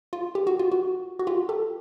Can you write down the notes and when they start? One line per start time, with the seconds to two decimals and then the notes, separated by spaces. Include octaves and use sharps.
0.13 F4
0.35 G4
0.47 F#4
0.59 F4
0.72 F#4
1.19 F#4
1.27 F4 G4
1.49 G4 A4